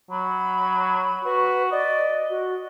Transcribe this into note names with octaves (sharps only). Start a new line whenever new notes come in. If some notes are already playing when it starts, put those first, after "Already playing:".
F#3 B5
F#4 B4
D5 D#5
F#4